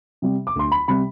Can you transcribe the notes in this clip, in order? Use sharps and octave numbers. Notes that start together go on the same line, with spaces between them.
C3 G3
D6
D2 C6
B5
C3 G3 B5